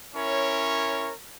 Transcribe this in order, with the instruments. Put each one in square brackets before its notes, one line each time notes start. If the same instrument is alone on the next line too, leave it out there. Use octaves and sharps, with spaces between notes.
[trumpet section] C#4 E4 A#4 C#5